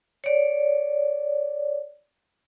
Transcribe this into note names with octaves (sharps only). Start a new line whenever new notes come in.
C#5 D5